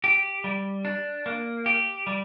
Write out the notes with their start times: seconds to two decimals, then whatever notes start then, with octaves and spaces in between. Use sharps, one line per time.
0.04 G4
0.44 G3
0.85 D4
1.26 A#3
1.66 G4
2.07 G3